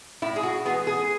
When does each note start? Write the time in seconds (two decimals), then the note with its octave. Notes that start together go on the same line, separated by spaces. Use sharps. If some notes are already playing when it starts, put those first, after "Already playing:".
0.22 A2 E4
0.36 G#4
0.43 F#4
0.65 E3 G#3 B3 G#4
0.87 G#4